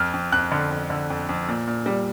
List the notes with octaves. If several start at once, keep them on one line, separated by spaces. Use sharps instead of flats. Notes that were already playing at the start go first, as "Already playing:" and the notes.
Already playing: F2 F6
F2
F2 F#6
D3
F2
D3
F2
F2
A#2
A#2
G3